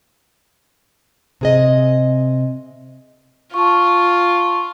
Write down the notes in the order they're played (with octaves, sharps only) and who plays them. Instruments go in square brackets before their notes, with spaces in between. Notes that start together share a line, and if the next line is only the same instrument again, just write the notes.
[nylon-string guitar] C3 G#4 D#5
[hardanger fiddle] F4 [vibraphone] A5 C#6